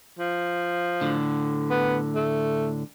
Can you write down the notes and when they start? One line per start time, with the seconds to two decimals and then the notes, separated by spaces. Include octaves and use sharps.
0.19 F3
1.01 A2 D3
1.70 B3
2.15 A3